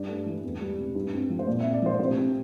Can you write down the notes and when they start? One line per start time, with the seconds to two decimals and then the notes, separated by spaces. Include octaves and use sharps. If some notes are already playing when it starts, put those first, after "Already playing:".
Already playing: G2 D5
0.09 A3
0.26 E3
0.44 E2
0.61 G3
0.78 C3
0.95 G2
1.13 C4
1.30 F3
1.39 C5
1.47 A#2 D5
1.60 E5
1.65 C4
1.73 D5
1.82 F3 C5
1.99 C3 C5
2.17 C4